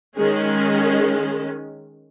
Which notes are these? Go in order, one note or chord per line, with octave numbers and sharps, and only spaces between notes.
D#3 G#3 C#4 G#4